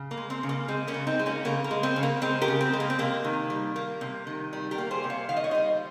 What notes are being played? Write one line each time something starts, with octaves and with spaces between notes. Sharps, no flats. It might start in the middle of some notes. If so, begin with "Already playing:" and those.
Already playing: C#3
A#3
G#3
C4
C#3
A#3
G#3 C4
A#3 C#4
C#3
C4 D#4
G#3
A#3 C#4
C#3 A#3
A#3
G#3
C4
C#3
A#3
G#3 C4
G4 A#4
C#3
C4
G#3
A#3
C4
C3 A#3
D#3
G3
A#3
C3
D#3
G3
G4 A#4
A#3
G#4 C5
C3
C#5 F5
D#3 F5
D#5
C#5
G3 C5 D#5